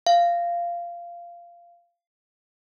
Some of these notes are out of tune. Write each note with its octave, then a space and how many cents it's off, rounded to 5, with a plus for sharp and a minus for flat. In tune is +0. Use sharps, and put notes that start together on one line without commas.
F5 -15